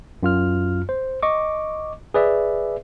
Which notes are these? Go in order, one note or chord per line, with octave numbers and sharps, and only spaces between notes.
F#2 F4 F6
C5
D#5 C#6 D6
G#4 B4 D5 E5